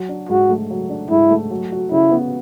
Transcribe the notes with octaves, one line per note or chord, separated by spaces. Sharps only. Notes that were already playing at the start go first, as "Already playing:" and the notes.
Already playing: F#3
D4
G#2 F#4
A3
F#3
D4
G#2 E4
A3
F#3
F#4
C#3 E4
B3